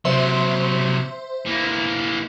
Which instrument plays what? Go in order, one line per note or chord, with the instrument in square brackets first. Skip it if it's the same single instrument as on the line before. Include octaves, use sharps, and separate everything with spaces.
[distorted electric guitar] C3 F#3 [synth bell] C5 E5 C6
[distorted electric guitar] E3 A#3